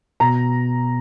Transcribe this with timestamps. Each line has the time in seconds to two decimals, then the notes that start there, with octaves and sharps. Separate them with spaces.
0.20 B2 A#5